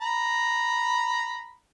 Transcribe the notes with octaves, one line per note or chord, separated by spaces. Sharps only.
A#5 B5